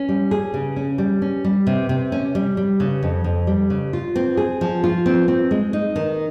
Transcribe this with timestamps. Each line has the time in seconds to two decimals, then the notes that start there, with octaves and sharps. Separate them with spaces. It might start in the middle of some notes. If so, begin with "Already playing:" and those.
Already playing: C#4
0.09 G3
0.31 G#4
0.54 C#3
0.76 C#4
0.98 G3
1.22 C#4
1.44 G3
1.67 C3
1.89 C3
2.12 C#4
2.35 G3
2.57 G3
2.80 C#3
3.03 F2
3.24 F2
3.47 G3
3.70 C#3
3.93 F4
4.16 C4
4.37 G#4
4.61 F3
4.84 F4
5.06 C4
5.28 C4
5.51 G#3
5.73 D#4
5.96 D#3